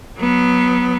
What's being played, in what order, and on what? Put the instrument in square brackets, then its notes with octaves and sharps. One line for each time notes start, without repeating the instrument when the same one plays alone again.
[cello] F#3 B3